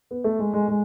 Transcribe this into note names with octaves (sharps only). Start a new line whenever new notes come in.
B3
A3
G#3
G#3
G#3